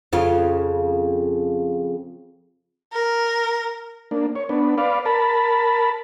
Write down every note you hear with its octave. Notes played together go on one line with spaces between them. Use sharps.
F2 C#3 F4
A#4
A#3 D4
C#5
B3 D4
B4 D5 F5
A#4 A5 B5